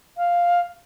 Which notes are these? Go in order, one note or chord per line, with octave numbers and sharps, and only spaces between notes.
F5